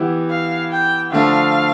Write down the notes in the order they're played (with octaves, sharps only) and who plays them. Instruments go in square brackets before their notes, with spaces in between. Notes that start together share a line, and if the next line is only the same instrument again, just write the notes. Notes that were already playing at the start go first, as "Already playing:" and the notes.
Already playing: [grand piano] E3 B3 E4 G4
[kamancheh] F5
G5
[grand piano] D3 F3 A3 [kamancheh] F5